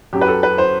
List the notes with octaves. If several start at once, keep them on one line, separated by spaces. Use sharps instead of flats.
F#2 F#3 G4
B4
A4
B4
C5